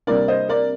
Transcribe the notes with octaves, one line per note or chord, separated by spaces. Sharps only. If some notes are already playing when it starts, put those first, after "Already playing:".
C3 G3 A#3 D4 A#4 D5
C5 D#5
A#4 D5